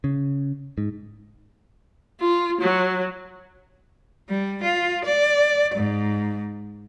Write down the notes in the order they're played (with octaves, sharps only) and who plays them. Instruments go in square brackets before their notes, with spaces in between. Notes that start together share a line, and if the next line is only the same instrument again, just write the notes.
[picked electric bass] C#3
G#2
[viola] F4
F#3
[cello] G3
F4
D5
G#2